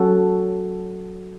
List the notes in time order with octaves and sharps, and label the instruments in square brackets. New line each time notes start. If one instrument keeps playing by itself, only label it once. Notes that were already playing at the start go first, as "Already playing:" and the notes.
Already playing: [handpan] F#3 C#4 F#4 A4